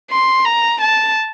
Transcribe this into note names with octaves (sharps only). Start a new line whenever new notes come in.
C6
A#5
A5